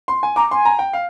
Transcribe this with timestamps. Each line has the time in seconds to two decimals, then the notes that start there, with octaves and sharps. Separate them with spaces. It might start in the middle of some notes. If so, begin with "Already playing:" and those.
0.08 C6
0.23 G#5
0.36 A#5 D6
0.51 G#5 C6
0.65 A#5
0.79 G5
0.93 F5